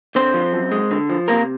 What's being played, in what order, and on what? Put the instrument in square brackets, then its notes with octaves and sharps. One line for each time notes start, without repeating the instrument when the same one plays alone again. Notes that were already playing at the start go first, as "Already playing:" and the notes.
[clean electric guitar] D3 C4 C5
F3
F#2
G#3
D3
F3
C3 A#3 A#4